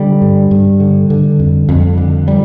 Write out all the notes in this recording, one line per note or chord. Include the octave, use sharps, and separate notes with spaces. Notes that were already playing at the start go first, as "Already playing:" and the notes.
Already playing: D3 G3
G2
G2
D3
D3
F2
F2
D3
G3